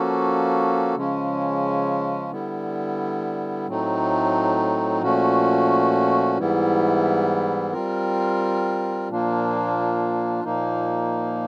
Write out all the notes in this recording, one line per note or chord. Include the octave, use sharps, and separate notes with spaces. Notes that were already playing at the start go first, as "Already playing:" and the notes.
Already playing: F3 A#3 C#4 F#4 A4
C#3 F3 G#3 C#4
D3 G3 B3 E4
A2 F#3 A3 C4 D#4
A#2 F3 A3 C#4 F#4
G#2 E3 G3 B3 E4
G3 C4 F4 A#4
A#2 F3 A#3 D4 F4
A#2 F3 A#3 D#4